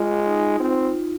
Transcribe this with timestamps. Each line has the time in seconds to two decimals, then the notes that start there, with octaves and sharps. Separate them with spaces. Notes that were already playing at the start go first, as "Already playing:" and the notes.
Already playing: G#3 F4
0.25 D#4
0.59 C4 F4